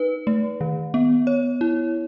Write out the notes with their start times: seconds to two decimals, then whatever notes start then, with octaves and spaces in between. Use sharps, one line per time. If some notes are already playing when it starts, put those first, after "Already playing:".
Already playing: D#4 B4
0.27 A3
0.61 D#3
0.94 B3
1.27 C#5
1.61 E4